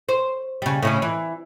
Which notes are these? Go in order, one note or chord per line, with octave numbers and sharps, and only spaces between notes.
C5
C#3 G3
A2 C#3 C#4
E3